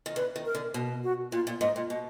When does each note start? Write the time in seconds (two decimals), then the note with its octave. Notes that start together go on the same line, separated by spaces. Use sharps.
0.06 D#3
0.16 D3 B4
0.36 D#3
0.45 A#4
0.55 D3
0.74 B2
1.04 F#4
1.32 A#2 F4
1.47 A#2
1.61 G#2 D#5
1.76 A#2
1.90 B2 D#5